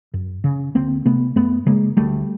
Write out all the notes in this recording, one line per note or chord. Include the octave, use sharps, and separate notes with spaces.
F#2
C#3
D2 A#3 C4
C3 A3 B3
F#2 A3 B3
C#3 G#3 A#3
D2 G3 A3